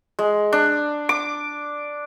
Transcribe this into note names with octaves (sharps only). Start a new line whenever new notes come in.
G#3
D4
D6